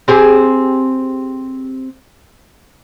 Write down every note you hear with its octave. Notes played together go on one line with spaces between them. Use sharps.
C4 G4 G#4